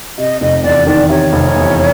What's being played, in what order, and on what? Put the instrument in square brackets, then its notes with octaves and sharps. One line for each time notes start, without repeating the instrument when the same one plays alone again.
[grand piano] C3 [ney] D#5
[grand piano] F1 [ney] D#5
[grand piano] E2 [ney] D5
[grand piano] D#3 [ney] D5
[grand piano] C3 [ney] C#5
[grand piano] F1
E2